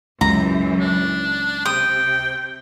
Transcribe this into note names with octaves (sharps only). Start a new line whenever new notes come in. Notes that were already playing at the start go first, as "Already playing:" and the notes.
C#2 F#2 E3 A#5
D4
C3 G5 D#6